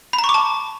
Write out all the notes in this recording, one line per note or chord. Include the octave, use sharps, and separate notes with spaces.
B5
A#5
C#6
D6
A5